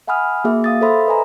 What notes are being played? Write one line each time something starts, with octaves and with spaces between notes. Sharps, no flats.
E5 F#5 G#5 B5 D#6 F6
A#3 F#4 G#4 E5
F5 D#6 A6
A4 C5 E5 B5 C6 D#6
B4 D#5 E5 G#5 A#5